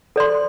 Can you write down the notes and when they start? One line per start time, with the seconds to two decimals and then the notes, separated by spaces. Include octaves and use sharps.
0.16 A4 D5 C6